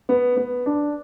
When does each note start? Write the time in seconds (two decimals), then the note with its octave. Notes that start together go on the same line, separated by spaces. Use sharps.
0.09 B3
0.37 B3
0.66 D4